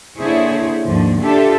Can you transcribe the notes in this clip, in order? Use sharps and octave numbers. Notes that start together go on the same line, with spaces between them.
D3 A#3 E4 G#4 C5 C#5
D#2 G#2 D3 F3
D3 D4 F4 G4 A4 E5